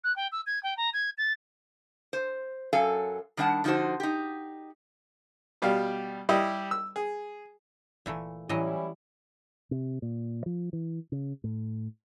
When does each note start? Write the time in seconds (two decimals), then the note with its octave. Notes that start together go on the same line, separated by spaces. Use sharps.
0.04 F#6
0.16 G5
0.32 E6
0.46 G#6
0.63 G5
0.77 A#5
0.93 G#6
1.18 A6
2.13 C5
2.73 F#2 F#3 A4 F5 G#5
3.37 D#3 G3 D4 D#5 F#5 A5
3.64 D3 F3 D#4 E4 F#4 C5
4.00 D#4 G4
5.62 B2 G3 G4 F5
6.29 G3 E4 G4 D#5
6.71 E6
6.96 G#4
8.06 G1 A#2 E3 A3
8.49 A2 E3 F#3 G3 C#4 E4 D#5
9.71 C3
10.02 A#2
10.46 F3
10.73 E3
11.12 C#3
11.44 A2